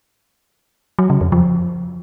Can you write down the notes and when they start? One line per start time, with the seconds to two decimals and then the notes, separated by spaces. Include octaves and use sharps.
0.99 F#3
1.10 C#3
1.21 F2
1.32 F3